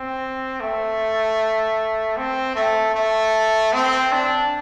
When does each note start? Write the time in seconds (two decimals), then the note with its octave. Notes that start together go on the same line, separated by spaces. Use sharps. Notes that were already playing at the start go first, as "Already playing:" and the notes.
Already playing: C4
0.60 A3
2.17 C4
2.55 A3
2.94 A3
3.73 C4
4.12 D4